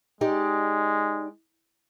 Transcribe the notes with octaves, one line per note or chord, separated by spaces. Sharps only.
G#3 D#4 G4 D5